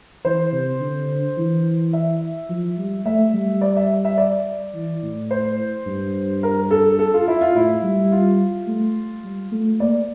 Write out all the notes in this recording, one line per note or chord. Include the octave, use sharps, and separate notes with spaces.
E3 C5
C3
D3
E3
E5
F3
G3
A3 E5
G3
D5
E5
E5
D5
E3
A2
C5
G2
A#4
A4
A4
F4
E4
F4
A2 E4
G3
F4
A3
G3
A3
A#3 D5